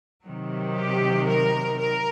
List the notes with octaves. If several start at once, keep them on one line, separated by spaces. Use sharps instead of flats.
C3 D#3 F#3
G4
A#4
A#4